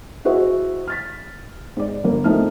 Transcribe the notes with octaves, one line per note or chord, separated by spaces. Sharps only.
E4 F#4 G#4 C5 D#5 E5
F6 A6 B6
G#2 D5
G1 A#3
A2 F3 A3 C4 D#4 F6